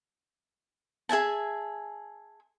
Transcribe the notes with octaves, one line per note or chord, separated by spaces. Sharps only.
G#4 E5 G#5 A5